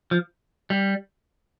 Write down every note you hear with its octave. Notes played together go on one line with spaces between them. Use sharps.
F3
G3